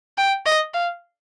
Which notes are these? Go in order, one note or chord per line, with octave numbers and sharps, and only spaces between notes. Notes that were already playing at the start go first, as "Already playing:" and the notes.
G5
D#5
F5